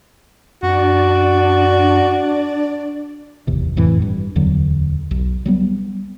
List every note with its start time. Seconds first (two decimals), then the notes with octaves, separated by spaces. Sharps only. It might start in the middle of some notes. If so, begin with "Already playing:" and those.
0.63 F#2 D4 F#4 D5
3.47 D1 G#1 E2 C3
3.76 G#1 F2 A2 E3
4.02 G2
4.36 D1 E2 D3 F#3
5.11 B1
5.46 F#3 G3 B3